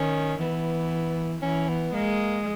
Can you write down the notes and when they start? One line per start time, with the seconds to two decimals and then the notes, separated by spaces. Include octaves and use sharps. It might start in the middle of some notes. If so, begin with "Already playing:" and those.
Already playing: D#3 C#4
0.40 E3 B3
1.42 E3 C#4
1.69 B3
1.94 G#3 A#3